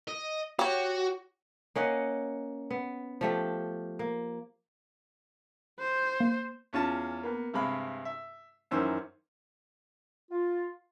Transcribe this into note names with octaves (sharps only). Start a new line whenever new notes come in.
D#5
F#4 G4 C#5
A#3 C#4 D#5 F#5
B3
F3 A3 G4
A#3
C5
A#3
E2 C#4 F4 A5
A#3 B3
G2 C3 G#3 F5 B5
E5
F#2 D#3 E3 C#4 C5 E6
F4